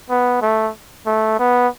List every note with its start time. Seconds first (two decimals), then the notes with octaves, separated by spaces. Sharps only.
0.10 B3
0.42 A3
1.06 A3
1.39 B3